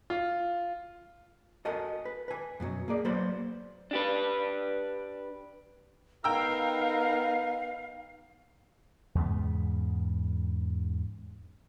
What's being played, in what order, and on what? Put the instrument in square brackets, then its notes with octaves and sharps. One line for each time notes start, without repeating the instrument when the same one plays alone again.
[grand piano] F4
[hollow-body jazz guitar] F#4 A4 A#4 D#5 F#5 G#5
B4
B4 G#5
F#2 B2 E3 F#3
A#3 G#4 D5
F#3 A#3 B3 C5 D5 B5
[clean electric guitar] D4 G4 B4
[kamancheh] B3 D#4 [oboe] A#4 [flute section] F5 [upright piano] G5 A#5 E6
[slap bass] E2 G#2 C#3 B3